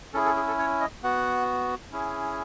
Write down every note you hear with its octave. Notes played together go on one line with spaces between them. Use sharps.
C#4 E4 G#4 A4
A4
G#4
A4
C#5
D#5
B3 F#4 F#5
C#4 E4 G#4